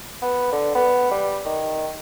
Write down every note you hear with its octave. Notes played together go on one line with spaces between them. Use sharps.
B3
D3
B3
G3
D#3